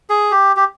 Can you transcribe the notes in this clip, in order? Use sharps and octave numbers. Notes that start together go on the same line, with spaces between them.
G#4
G4
G4